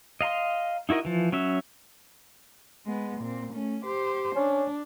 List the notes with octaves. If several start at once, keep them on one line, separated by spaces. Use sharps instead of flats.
D#5 F5 A#5 C6
D#4 E4 F#4 A#4 D#5
E3 F3
F#3 C#4 E5
G#3 B3
A#2 C4
A3 C#4
G4 C5
C#4 D4